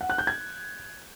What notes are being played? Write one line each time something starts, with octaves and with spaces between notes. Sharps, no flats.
F#5
F#6
G6
G#6